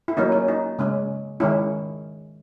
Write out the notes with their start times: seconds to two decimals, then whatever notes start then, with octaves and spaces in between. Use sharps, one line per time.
0.08 E4
0.17 F#3 A#3 C#4 D#4
0.32 C#4
0.48 D#4
0.79 C#3 G#3 C#4
1.40 D#3 G#3 C#4 E4